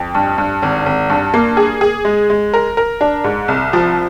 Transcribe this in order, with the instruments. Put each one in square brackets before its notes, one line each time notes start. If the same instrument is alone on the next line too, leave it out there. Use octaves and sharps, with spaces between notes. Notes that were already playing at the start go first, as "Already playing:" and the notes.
Already playing: [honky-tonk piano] F2
G2
G2
G#1
G#1
G2
A#3
G#4
G#4
G#3
G#3
A#4
A#4
D4
G#2
C2
F3